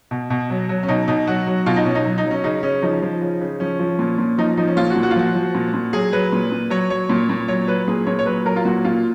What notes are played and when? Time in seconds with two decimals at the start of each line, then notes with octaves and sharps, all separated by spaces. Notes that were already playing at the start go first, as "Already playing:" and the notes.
0.11 B2
0.30 B2
0.50 F#3
0.69 F#3
0.83 C#4
0.88 B2 D#4
1.08 B2 D#4
1.27 F#3 F#4
1.47 F#3
1.66 B2 F4
1.76 D#4
1.85 B2 C#4
1.95 D#4
2.05 F#3
2.18 D#4
2.24 F#3
2.31 C#4
2.44 C#3 D#4
2.63 C#3 C#4
2.82 F3 D#4
3.02 F3
3.21 C#3
3.41 C#3
3.60 F3 C#4
3.79 F3
3.99 A#2
4.18 A#2
4.38 F3 D#4
4.57 F3 D#4
4.67 C#4
4.77 A#2 F4
4.90 F#4
4.96 A#2
5.03 F#4
5.11 F4
5.16 F3 F#4
5.35 F3
5.55 A#2
5.74 A#2
5.93 F#3 G#4
6.12 F#3 B4
6.32 A#2
6.51 A#2
6.70 F#3 C#5
6.90 F#3 C#5
7.09 A#2
7.29 A#2
7.48 F#3 C#5
7.68 F#3 B4
7.88 A#2 G#4
8.07 A#2 C#5
8.19 C#5
8.26 F#3 B4
8.45 F#3 A#4
8.56 F4
8.65 A#2 F#4
8.84 A#2 F4